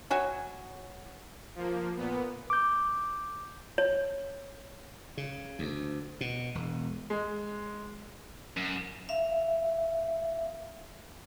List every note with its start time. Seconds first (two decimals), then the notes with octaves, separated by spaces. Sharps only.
0.10 F#3 F#4 C#5 G#5
1.56 F3 A#3
1.97 A#2 B3
2.50 D6 G6
3.78 C#5
5.17 C#3
5.59 D2
6.21 B2
6.55 E1
7.10 G#3
8.57 F#2
9.09 E5 F5